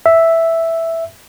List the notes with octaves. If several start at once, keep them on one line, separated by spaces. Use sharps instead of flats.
E5